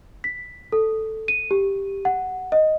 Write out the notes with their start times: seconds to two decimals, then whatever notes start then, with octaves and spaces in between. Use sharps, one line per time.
0.24 B6
0.72 A4
1.28 D#7
1.51 G4
2.05 F#5
2.52 D#5